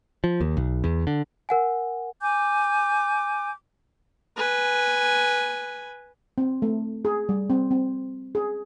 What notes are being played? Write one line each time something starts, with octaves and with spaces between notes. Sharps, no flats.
F3
D#2
B1
E2
D3
A#4 F#5 G#5
G#5 D6 G6
B4 G#5
C4
A3
G#4
G3
C4
C4
G#4